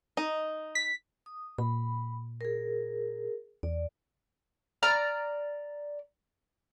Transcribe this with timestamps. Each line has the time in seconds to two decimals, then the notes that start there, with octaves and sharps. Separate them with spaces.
0.17 D#4 D#5
0.75 B6
1.26 D#6
1.58 A#2 B5
2.41 G#4 A#4
3.63 E2 D5
4.83 D5 A#5 F6